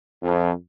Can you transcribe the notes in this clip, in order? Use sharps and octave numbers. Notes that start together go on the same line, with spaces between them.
F2